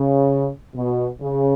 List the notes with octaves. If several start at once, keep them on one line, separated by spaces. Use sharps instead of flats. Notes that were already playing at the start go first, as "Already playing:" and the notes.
Already playing: C#3
B2
C#3